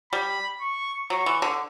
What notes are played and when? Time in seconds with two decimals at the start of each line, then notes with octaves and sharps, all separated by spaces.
0.12 G3 B5
0.61 C#6
1.10 F#3 C#6
1.26 E3
1.42 D3